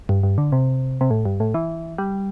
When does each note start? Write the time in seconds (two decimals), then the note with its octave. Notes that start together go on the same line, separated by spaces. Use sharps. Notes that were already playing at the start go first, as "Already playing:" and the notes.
0.09 G2
0.23 G2
0.38 D3
0.52 C3
1.01 C3
1.11 A2
1.25 G2
1.40 A2
1.54 E3
1.98 G3